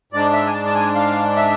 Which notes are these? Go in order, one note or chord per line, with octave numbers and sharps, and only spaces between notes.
G#2 G#3 D4 D5
E5
G#5
A5
A5
G#5
F5
E5